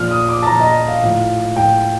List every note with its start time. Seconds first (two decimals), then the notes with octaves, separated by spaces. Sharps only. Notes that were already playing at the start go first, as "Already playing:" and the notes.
Already playing: A#2 F3 F6
0.11 D#6
0.29 D6
0.42 A5
0.47 A#2 F3 A#5
0.61 D#5
0.88 F5
1.03 A2 F3
1.56 A2 F3 G5